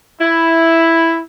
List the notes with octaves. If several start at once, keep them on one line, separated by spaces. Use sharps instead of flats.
E4